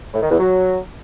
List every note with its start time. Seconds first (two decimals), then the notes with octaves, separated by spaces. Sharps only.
0.13 A2
0.22 D#3
0.30 E2
0.39 F#3